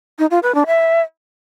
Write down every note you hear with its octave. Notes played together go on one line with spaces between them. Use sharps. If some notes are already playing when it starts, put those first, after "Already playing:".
D#4
F4
B4
D4
E5